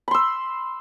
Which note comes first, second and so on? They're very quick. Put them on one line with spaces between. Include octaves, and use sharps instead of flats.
B5 C6 E6